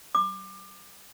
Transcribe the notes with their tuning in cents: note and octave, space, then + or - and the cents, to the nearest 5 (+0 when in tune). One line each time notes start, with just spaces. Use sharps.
D6 +25